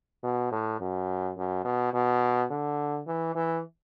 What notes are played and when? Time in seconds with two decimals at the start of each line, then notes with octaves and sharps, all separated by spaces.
0.24 B2
0.52 A2
0.80 F#2
1.38 F#2
1.65 B2
1.93 B2
2.50 D3
3.07 E3
3.35 E3